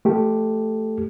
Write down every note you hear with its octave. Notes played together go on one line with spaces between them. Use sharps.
A3 G4 A4